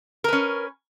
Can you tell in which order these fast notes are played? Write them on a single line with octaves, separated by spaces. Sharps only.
A#4 B4 C#4